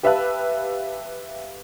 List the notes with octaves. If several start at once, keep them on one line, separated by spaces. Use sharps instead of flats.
G4 B4 E5 F5 A5 F#6